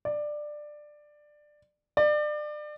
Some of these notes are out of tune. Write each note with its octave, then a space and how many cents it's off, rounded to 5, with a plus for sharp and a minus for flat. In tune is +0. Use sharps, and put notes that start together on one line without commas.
D5 +15
D5 +30